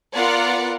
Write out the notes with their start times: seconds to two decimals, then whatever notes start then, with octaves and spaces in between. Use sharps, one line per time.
0.15 B3 F4 A#4 D5 F#5